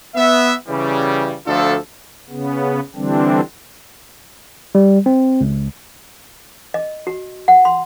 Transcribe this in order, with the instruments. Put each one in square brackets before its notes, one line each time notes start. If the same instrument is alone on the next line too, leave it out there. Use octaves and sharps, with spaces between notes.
[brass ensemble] B3 E5
C#3 E3 G3
D2 F3 D4 F4 A4
[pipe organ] C#3 B3
D3 E3 G3 C4 D4
[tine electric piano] G3
C4
C#2
[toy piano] D#5
F#4
F#5
C6